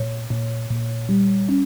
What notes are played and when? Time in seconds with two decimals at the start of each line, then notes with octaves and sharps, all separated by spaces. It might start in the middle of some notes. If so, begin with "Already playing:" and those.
Already playing: A#2 C#5
0.30 A#2
0.70 A#2
1.09 G3
1.49 C#4